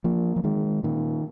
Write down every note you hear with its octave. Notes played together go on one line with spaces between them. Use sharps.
F3 A#3
F3
D#3 G#3
A#2 D#3